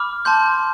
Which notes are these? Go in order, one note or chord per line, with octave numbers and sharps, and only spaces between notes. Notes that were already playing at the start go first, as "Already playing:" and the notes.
Already playing: B5 D6 F6
A5 C6 G6